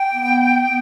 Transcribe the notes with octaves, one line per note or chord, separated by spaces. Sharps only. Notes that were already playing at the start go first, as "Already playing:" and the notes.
Already playing: G5
B3
B3